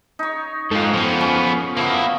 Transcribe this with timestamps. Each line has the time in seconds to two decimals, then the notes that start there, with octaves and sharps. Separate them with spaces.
0.19 D#4 C#5
0.71 G#2 F4 A4
0.93 F3 B3
1.21 C#4 C#5
1.77 F3 A#3 B3 E4